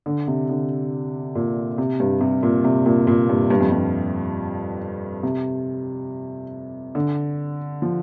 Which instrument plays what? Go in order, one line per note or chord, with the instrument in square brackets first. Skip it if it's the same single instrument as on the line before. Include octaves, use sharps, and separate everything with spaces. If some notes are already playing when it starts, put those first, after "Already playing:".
[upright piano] D3
C3
D3
A#2
C3
G2
C3
A#2
C3
A#2
A#2
G2
G2
F2
G2
C3
D3
F3